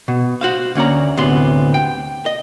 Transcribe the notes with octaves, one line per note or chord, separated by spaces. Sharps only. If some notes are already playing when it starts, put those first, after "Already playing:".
B2
F#4 C5 F5
D2 A#3 C#4 D5 A#5
D2 A2 C3 B3 C6
G5
D#5